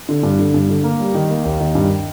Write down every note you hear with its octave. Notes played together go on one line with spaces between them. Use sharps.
D3
G2
D3
G2
D3
A#3
G3
D#3
A#3
D#2
D#3
G2